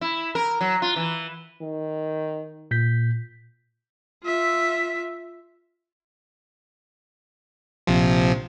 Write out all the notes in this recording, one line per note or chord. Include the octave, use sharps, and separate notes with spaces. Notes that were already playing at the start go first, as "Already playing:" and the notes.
E4
A#4
F#3
F4
E3
D#3
A#2 G6 B6
F4 E5
A#1 C3 F3